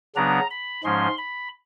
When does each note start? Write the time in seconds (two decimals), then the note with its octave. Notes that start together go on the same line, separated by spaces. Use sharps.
0.16 C#3 F#3 B3 D4 A#5
0.51 B5
0.84 G#2 F3 G#3 C#4 C6
1.18 B5